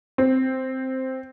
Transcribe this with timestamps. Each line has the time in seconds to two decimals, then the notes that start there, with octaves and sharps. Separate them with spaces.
0.18 C4